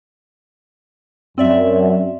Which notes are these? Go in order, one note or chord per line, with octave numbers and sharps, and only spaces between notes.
F#2 C4 D5 E5